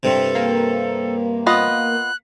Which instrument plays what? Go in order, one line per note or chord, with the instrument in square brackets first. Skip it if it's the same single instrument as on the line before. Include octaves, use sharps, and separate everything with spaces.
[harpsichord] G2 C3 [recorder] A4
[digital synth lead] A#3
[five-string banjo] B3 F4 D#5 [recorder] F#6